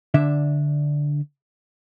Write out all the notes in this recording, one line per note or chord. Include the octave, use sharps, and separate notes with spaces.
D3 D4 E5